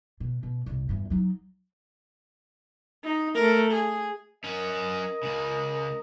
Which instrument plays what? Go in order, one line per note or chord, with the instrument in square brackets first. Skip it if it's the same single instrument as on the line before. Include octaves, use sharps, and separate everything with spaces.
[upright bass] B2
B2
C2 C3
E2 G2
F#3 D#4
[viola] D#4
A3 A#4
G#4
[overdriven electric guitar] F#3 C#4 [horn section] A#4 D#5
[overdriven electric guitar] C#2 C#3